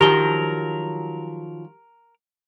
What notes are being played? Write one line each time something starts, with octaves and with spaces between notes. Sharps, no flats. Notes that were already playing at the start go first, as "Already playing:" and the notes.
D#3 F3 F#3 G4 A#4 G7